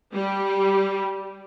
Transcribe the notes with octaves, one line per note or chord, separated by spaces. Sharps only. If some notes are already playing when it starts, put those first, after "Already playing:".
G3